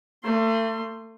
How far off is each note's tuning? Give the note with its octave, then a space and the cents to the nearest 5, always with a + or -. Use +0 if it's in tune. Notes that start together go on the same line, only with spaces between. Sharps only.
A3 +35 C6 +0